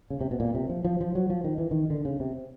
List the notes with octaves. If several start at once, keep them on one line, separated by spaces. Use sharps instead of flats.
C#3
C3
B2
A#2
C3
F3
F3
F3
F#3
F3
D#3
E3
D#3
D3
C#3
C3